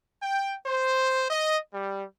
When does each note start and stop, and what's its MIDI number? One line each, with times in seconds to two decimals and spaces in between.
0.22 0.55 79
0.66 1.24 72
1.30 1.57 75
1.74 2.04 55